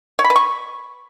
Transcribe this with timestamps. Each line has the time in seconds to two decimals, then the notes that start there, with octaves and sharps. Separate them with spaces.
0.19 C#5
0.24 B5
0.30 B4
0.36 C#6